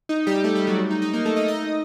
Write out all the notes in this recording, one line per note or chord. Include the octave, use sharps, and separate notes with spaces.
D#4
G3 G4
A3 A4
G3 G4
F#3 F#4
D#4
D#4
A#3 A#4
A3 A4
D#4 D#5
D#4 D#5